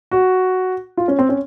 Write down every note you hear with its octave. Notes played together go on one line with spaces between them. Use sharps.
F#4
F4
C#4
C4
C#4